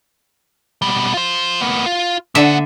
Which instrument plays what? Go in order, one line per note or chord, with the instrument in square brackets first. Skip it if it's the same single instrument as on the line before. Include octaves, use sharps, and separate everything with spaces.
[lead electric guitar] B2 G3
F4 C5
A#3 B3
F4
[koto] D3 E5 [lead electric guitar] A#3 F#5